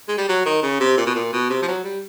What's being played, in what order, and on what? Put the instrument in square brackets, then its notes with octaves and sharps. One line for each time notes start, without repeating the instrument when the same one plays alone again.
[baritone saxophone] G#3
G3
F#3
D#3
C#3
C3
A#2
B2
A#2
B2
C3
F3
F#3
G3